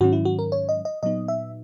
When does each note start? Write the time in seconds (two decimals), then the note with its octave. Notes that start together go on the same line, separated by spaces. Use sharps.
0.01 G#2 D#3 F#3 C#4 F#4
0.13 E4
0.25 F#4
0.39 A#4
0.52 C#5
0.69 D#5
0.85 D#5
1.03 A#2 F#3 B3 D#4 D#5
1.28 E5